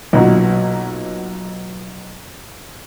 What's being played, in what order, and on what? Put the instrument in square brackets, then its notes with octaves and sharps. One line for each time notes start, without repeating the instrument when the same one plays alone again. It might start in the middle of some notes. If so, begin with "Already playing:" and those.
[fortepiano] B1 A#2 F#3